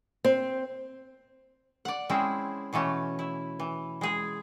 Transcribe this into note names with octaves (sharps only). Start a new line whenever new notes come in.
C4
D5 F#5
G#3 C4 C#4 E4
B2 E3 A3 C#4
E4
E3
G#3 G#4